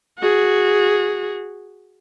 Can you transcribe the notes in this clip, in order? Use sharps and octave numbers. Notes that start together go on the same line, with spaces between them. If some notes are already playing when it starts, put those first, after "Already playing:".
F#4 G#4